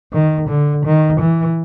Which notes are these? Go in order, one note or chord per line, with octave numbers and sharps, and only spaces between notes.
D#3
D3
D#3
E3